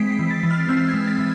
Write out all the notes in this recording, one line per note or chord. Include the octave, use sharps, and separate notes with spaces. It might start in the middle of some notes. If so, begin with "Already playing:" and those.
Already playing: E3 G#3 C4 B6 C7 D7
B6
E3
A6
E3
F6
C4 E6
G#6
G#3
A6
E3